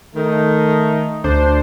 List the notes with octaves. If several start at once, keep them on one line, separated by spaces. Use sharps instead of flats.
D#3 A3 D#4
D2 D4 C5